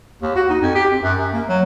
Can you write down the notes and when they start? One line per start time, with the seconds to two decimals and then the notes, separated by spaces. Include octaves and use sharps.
0.22 D#2
0.36 F#4
0.50 D#4
0.62 F2
0.75 G4
0.91 C4
1.03 F#2
1.20 F#2
1.33 A#3
1.49 F#3